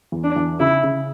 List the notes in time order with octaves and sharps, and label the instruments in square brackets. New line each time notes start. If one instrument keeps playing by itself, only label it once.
[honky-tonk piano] E2
[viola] D4
[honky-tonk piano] E2
[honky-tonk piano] C#3 [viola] E4
[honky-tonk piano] C#3